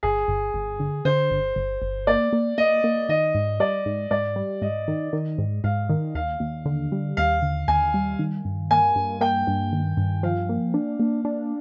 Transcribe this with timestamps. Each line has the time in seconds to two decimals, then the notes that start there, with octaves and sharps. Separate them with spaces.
0.03 G1 G#4
0.28 G1
0.54 G1
0.80 D3
1.05 D3 C5
1.30 G1
1.56 G1
1.82 G1
2.07 A#3 D5
2.33 A#3
2.58 A#3 D#5
2.84 A#3
3.09 D#3 D#5
3.35 G#2
3.60 G3 D5
3.86 G#2
4.11 G#2 D5
4.36 G3
4.62 G#2 D#5
4.88 D#3
5.13 D#3
5.38 G#2
5.64 G#2 F5
5.89 D#3
6.15 D#2 F5
6.40 D#2
6.66 D3
6.92 G3
7.17 D#2 F5
7.42 D3
7.68 D#2 G#5
7.94 G3
8.19 D#3
8.45 G2
8.71 A#3 G#5
8.96 G2
9.21 A#3 G5
9.47 G2
9.72 D#3
9.97 G2
10.23 F3 F5
10.49 A#3
10.74 D4
11.00 A#3
11.25 D4